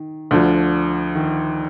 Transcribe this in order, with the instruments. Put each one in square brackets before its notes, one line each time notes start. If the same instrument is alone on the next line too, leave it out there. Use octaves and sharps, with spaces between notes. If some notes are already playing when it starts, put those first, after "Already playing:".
Already playing: [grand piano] D#3
[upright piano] D2 D3 F3
[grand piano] D#3